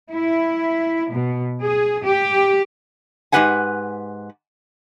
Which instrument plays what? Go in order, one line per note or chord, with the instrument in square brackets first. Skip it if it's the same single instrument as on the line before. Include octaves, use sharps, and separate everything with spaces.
[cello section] E4
B2
G#4
G4
[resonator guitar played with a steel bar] G#2 A#3 G4 B4 F#5 G#5